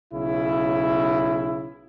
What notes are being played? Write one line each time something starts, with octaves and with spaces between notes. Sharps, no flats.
B1 C#3 E4